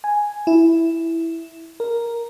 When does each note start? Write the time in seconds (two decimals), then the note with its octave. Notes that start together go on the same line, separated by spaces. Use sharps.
0.04 G#5
0.47 E4
1.80 A#4